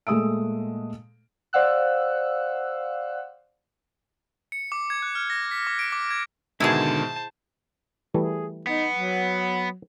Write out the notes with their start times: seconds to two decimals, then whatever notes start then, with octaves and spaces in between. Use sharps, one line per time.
0.07 A#2 G#3 A3 D#6 E6 D7
1.53 C5 D5 F5 F#5 E6 F#6
4.52 C#7
4.72 D6
4.90 G#6
5.02 F#6
5.15 F6
5.30 A#6
5.51 B6
5.67 D6
5.79 D7
5.92 D6
6.10 G#6
6.60 G#2 B2 D3 D#3 E4 G#4 C5 A5
8.14 E3 G3 A3 G#4
8.67 B3 D#4
8.93 F#3